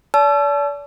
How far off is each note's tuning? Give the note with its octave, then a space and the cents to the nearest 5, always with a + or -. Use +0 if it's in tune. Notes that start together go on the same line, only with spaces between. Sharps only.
D5 -40 A5 -30 E6 +35